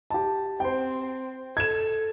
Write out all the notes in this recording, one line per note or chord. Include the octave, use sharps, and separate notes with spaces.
G4 A5
C4 C5 G5
A4 G#6 E7